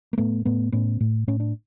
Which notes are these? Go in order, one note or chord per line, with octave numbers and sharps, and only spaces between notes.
A#3
A2 A3 B3
A2 A3 B3
A2 B3 C#4
A2
A2 C#4
D4